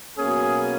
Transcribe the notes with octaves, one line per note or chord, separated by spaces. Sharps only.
B2 F#3 A#3 C#4 G#4